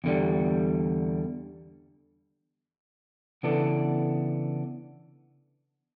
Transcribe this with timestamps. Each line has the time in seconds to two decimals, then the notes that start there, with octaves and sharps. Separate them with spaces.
0.04 E2 D3 G3
3.43 C#3 E3 B3 D4 A4